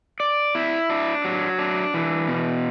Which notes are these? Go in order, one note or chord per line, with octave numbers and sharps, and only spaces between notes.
D5
E4
D4
F#3
D4
E3
B2